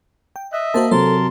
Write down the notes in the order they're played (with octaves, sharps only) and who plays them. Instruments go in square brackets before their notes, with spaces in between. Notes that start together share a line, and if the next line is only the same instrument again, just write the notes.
[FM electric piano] G5
[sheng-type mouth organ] D#5 E5 [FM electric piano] F#6
[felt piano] A#3 [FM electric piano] F#4 C5 A5
[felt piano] C3 F#3 [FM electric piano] A4 C5 [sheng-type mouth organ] A#4 A5 C6